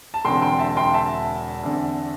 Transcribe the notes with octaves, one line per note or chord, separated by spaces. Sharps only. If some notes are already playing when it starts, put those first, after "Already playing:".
A5
E1 E2 D3 C4 G5 C6
G5 C6
E5 A5
G5 C6
E5 A5
E2 D3 C4